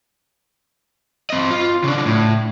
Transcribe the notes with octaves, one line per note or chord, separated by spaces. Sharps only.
C4 D#5
F4
C#3 D4
A2